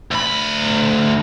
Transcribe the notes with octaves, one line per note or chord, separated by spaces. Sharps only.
D2 B5